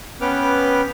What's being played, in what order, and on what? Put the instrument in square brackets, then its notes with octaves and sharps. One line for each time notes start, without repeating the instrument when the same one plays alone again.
[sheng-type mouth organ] B3 C#4 B4 G5 D6 F6